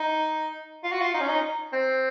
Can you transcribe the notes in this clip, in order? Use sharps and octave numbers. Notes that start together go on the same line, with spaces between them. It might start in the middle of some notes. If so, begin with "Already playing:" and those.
Already playing: D#4
F4
F#4
F4
D#4
C#4
D#4
C4